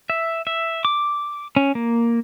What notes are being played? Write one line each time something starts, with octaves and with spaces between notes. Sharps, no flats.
E5
E5
D6
C#4
A#3